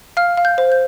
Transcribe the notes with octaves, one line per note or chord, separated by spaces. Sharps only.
F5 F6
F5
G6
C5
G6